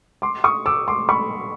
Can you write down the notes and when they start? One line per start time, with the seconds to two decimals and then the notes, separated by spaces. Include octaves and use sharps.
0.22 C6 D6
0.44 C#6 D#6
0.66 D6 E6
0.88 C6 D6
1.09 B5 C#6